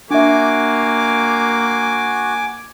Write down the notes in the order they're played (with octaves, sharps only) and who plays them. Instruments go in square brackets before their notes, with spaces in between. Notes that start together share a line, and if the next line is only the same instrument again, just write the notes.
[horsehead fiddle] A#3 [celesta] D4 E5 [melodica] F#4 [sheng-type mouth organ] G#5 D6